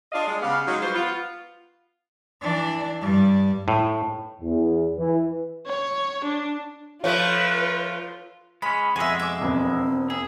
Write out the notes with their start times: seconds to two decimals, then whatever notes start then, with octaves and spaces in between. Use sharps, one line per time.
0.12 D4 F4 G#4 D5 D#5 F5
0.28 G#3
0.42 C#3 B3 G4 F5
0.67 F#3 G#3 D#4
0.82 G3 F4 F#4 B4 C5
0.95 B3 F4
2.42 E3 D4
3.02 G2 G3
3.68 A2
4.42 E2
4.98 E3
5.67 C#5
6.25 D4
7.04 F3 A3 F4 B4 C#5
8.62 G#3 C#4 B5
8.96 F2 B2 G#3 E5 G#5
9.20 E5 D6
9.42 E1 B3 C4
10.10 G#4 E5